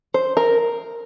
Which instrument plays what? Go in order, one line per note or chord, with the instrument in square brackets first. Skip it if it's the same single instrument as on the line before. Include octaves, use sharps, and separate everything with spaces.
[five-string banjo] C5
A#4